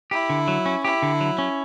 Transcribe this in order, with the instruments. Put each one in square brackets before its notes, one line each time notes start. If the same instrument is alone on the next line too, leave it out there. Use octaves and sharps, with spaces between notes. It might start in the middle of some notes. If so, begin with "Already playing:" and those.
[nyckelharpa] E4 [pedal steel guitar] G4
[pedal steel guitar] D3
F#3
C#4
[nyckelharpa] E4 [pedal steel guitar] G4
[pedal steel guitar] D3
F#3
C#4